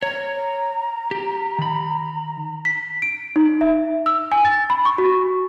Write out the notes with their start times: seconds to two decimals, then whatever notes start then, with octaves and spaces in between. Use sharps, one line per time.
0.03 C#5 A#5
1.11 G4
1.58 D#3 B5
2.65 B6
3.02 D7
3.36 D#4
3.61 E5
4.06 E6
4.32 G#5
4.45 A6
4.70 B5
4.85 C#6
4.98 F#4